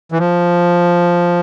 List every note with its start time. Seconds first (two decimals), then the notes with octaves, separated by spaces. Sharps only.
0.12 E3
0.19 F3